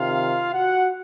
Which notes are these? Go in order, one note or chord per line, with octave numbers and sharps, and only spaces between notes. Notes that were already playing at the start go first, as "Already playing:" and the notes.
Already playing: C3 D#3 F4 F5
F#4 F#5